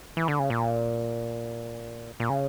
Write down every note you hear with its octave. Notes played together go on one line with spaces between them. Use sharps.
E3
D3
C#3
A#2
A#2
C#3